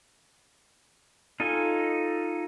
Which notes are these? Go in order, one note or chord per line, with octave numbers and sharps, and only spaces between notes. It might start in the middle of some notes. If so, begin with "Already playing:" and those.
D#4 F4 A4 D#5 G#5